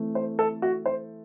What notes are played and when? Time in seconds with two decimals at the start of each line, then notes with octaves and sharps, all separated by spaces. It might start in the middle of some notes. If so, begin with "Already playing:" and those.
Already playing: E3 A3 C4
0.15 C5
0.39 A4
0.62 F#4
0.86 C5